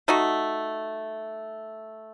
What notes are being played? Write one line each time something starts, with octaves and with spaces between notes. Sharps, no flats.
A3 D#4 F#4